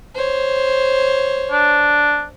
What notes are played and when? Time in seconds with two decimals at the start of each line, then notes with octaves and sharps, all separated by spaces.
0.15 C5 C#5
1.51 D4